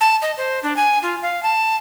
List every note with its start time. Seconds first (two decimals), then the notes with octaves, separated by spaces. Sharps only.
0.01 A5
0.22 D#5
0.37 C5
0.63 D4
0.76 G#5
1.03 F4
1.22 F5
1.43 A5